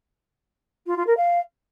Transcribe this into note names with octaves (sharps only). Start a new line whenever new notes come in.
F4
F4
A#4
F5